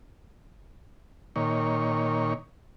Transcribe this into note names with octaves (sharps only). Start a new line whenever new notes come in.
A#2 D#3 C#5